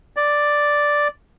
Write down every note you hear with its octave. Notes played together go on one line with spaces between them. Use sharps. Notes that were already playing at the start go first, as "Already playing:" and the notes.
D5